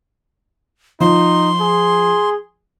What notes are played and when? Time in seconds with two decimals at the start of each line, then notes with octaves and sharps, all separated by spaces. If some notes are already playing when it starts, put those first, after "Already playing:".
1.00 F3 D#4 C6
1.61 G#4